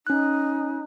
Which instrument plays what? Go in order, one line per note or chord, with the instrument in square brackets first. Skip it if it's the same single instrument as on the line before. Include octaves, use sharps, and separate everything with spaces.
[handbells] C#4 F#6 [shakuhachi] D#4